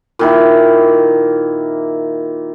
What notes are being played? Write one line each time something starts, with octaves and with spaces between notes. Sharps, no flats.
A#2 D#3 E4